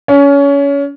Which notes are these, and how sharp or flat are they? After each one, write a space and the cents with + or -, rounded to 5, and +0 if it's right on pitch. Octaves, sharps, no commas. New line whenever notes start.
C#4 +25